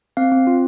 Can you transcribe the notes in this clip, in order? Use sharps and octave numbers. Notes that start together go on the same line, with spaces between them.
C4 F5
C4
F4